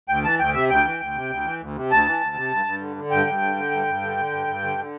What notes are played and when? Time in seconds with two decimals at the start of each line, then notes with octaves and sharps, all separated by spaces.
0.09 D2 G5
0.24 E3 A5
0.39 D2 G5
0.54 C3 E5
0.70 D2 G5
0.85 E3
1.00 D2
1.15 C3
1.30 D2
1.45 E3
1.60 D2
1.76 C3
1.91 D2 A5
2.06 E3
2.20 D2
2.36 C3
2.51 G2
2.66 G2
2.81 D3
2.96 D3
3.11 G2 G5
3.27 G2
3.42 D3
3.56 D3
3.71 G2
3.87 G2
4.02 D3
4.18 D3
4.32 G2
4.48 G2
4.62 D3
4.78 D3